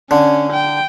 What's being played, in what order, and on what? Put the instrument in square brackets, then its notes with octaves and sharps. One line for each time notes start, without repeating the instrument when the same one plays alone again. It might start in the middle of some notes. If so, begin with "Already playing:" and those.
[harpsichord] D3 [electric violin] C#4
[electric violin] G5